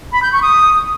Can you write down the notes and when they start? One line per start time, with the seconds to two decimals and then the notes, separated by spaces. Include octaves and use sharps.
0.12 B5
0.22 G6
0.32 C#6
0.42 D#6